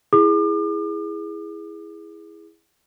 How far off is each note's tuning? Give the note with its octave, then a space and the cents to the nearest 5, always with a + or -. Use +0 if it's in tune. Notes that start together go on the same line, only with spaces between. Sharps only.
E4 +0 G#4 -5 D6 +40